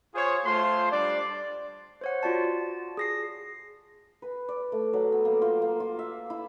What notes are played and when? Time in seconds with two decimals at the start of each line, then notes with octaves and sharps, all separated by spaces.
0.15 F4 G#4 C5 C#5
0.45 A3 F4 C5 C6
0.92 G3 D4 D5
2.01 C5 C#5 F#5
2.23 F4 F#4 D5 A5
2.97 G#4 A#6 C7
4.22 B4
4.49 D5
4.72 A3
4.93 F#3
5.12 B3
5.25 A#3
5.42 F4
5.62 A#3
5.80 F4
5.99 E5
6.30 E4